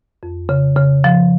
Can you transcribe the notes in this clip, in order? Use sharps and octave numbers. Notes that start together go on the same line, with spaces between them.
F2
C#3
C#3
F3